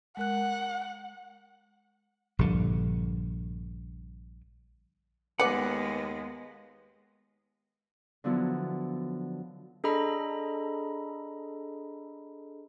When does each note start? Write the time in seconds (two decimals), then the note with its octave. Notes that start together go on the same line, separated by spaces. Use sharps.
0.17 G#3 A#4 F#5 F#6
2.39 A#1 G2 D3
5.40 D#2 G#3 B3 B4 D5 F#5
8.24 D3 F3 F#3 B3 E4
9.84 D4 G#4 A4 D#5 A#5 B5